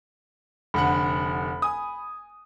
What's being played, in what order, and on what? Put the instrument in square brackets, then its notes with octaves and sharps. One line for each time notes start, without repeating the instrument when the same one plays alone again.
[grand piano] F1 D3 F#5 [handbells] B5
[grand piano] G#5 D#6